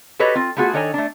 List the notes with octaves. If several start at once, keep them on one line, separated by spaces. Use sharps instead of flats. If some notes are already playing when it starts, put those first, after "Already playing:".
F#4 G4 A4 B4 C#5 D#5
C4 F4
A3 B3 F4 F#4 G#4
D#3 D4 A4 C#5 D#5 G#5
A3 D4